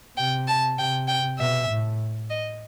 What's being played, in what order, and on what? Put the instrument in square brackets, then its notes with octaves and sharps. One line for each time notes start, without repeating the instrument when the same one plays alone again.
[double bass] C3 [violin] G5
[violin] A5
[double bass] C3 [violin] G5
[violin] G5
[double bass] B2 [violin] E5
[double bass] A2
[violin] D#5